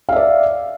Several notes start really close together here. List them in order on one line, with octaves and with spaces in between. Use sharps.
F5 E5 D5